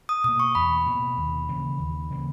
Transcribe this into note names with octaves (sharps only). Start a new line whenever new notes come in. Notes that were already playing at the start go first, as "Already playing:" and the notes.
D#6
B2 A#3 D#6
C#6
E2 B5
B2 A#3
D#2
C#3 E3 A#3
D#2
C#3 E3 A#3